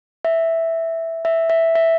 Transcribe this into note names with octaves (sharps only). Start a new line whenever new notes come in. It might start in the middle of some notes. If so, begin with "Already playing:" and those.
E5
E5
E5
E5